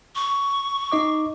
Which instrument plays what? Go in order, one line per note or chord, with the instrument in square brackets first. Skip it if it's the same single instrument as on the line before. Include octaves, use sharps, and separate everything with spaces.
[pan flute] C#6
[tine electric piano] D#4 D#5 D6